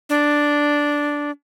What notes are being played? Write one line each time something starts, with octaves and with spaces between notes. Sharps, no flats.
D4